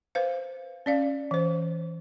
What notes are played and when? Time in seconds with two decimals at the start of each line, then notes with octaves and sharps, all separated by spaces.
0.15 B4 C5 F5
0.86 C#4 D5 F5
1.31 E3 C5